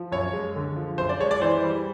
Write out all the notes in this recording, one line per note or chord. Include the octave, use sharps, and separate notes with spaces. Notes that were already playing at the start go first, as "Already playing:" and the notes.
Already playing: F3
F#2 C#5
G#3
D3
F3
F#2 C5
D5
G#3 C#5
D5
E3 C5
G3